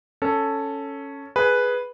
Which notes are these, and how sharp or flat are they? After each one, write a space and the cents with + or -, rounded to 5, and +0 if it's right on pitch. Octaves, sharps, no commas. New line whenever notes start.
C#4 +0 A4 +5
G#4 +10 B4 +0